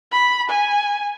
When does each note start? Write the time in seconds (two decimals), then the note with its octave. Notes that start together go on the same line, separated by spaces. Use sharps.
0.12 B5
0.50 G#5